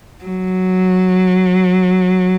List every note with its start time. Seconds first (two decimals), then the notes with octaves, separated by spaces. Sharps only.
0.24 F#3